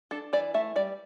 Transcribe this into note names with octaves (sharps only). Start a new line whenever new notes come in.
D4 A4
E3 D5
A3 E5
G3 D5